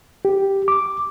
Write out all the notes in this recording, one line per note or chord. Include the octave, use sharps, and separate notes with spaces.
G4
D6